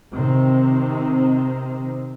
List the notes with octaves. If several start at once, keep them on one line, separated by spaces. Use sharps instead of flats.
C3 D#3 C4